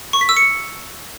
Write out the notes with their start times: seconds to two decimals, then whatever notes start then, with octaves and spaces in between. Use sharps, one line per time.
0.13 C#6
0.21 B6
0.29 E6
0.37 C#7